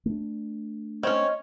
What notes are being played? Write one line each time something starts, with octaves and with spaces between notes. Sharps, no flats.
A3 D4
C4 C#4 C#5 D#5